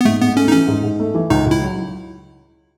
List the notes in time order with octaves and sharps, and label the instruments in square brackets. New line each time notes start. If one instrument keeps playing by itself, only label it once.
[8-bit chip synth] B3
[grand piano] G#2 [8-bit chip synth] A3
[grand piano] G#2 [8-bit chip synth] B3
[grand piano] A3 [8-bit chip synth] C#4
[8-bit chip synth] D#4
[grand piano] E3 [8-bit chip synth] C#4
[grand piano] G#2
G#2
A3
E3
[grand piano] C#2 [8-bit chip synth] D#4
[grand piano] C#2
[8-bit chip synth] E4
[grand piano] F#3